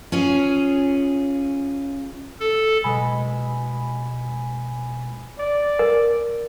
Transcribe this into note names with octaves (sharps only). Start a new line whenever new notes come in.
C#4 F4 G#4
A4
B2 G#3 G#5 B5
D5
A#4